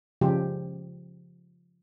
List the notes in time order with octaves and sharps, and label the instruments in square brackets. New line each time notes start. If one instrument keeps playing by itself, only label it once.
[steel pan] C#3 F3 G#3 G4